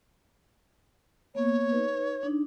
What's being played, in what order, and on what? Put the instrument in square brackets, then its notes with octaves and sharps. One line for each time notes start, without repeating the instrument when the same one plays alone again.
[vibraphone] A#3 B3 [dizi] C#5
[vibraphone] D#4 B4
D4 D#4